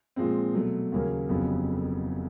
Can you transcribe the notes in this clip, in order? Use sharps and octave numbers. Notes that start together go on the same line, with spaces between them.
A#2 F3 G#3 C4
B2 F#3 A3
D#2 C#3 F#3 A#3 C#4
F1 F2 C#3 F#3 B3